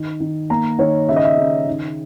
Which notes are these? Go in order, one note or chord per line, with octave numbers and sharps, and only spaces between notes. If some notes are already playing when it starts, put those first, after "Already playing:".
Already playing: D#3
D#3
A#3 A#5
D#3 C#5
C#3 E5
D#5
E5
C#3
D#3